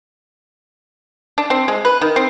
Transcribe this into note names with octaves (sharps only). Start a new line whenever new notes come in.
D4
C4
G#3
B4
D#3
C4